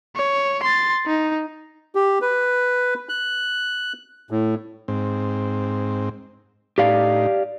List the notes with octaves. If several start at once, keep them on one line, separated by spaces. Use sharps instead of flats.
C#5
C6 A6
D#4
G4
B4
F#6
A2
G#2 C4
A2 D#4 G4 D5 F5